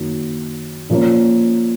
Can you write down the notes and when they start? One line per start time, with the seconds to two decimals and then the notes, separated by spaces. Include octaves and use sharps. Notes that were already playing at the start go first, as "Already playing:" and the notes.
Already playing: F#2 D#3 F#3 A#3
0.90 A#2 F3 A#3 C#4